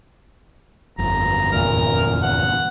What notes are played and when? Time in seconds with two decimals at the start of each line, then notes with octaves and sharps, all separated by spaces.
0.98 G1 F2 A#5
1.52 E2 A#2 A#4
2.22 F#5